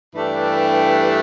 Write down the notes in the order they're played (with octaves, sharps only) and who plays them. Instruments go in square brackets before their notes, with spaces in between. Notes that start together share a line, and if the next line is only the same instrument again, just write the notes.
[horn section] G2 E3 A3 D4 G4